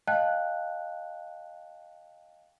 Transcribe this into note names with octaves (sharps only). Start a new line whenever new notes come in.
D#5 F5 G5 A5 F#6